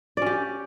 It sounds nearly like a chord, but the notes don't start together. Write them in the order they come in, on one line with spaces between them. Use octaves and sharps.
D5 C#4 G4